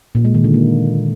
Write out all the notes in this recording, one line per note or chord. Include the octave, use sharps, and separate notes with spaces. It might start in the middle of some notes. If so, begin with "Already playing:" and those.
A#2
G#3
D#3
D3
A#3